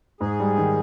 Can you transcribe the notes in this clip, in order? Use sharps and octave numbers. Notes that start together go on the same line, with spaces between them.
G#2 G#4
G3
D#3